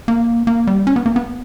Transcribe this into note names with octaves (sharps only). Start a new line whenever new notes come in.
A#3
A#3
G3
C#4
B3
A#3
B3